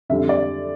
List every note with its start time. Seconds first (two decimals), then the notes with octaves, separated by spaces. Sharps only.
0.09 F2 D3 G3 E5
0.29 D5